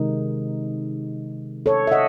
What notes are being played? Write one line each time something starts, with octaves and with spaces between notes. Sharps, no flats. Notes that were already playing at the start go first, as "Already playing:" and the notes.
Already playing: C3 D#3 G#3 D#4
A4 C#5
E5
D#5 F#5